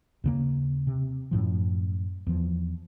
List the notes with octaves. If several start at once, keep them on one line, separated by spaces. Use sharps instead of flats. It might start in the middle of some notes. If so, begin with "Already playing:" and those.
D#2 C#3 A#3
C3
F#2 A2 F3
E2 F3